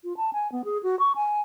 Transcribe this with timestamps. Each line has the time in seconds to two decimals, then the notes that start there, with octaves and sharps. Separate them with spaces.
0.04 F4
0.17 A5
0.33 G#5
0.52 B3
0.65 G#4
0.83 F#4
0.99 C#6
1.16 G#5